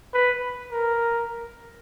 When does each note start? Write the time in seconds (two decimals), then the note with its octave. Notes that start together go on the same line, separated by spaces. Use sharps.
0.14 B4
0.72 A#4